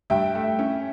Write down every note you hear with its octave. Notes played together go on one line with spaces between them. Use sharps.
G2 E5 G5
A3
C#4